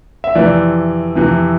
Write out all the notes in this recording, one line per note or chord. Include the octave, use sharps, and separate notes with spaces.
E5
F2 C3 E3 D5
F2 C3 E3